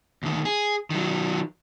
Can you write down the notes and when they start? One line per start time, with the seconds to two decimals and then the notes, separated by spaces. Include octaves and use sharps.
0.23 D2 D#3
0.45 G#4
0.90 D#3 F#3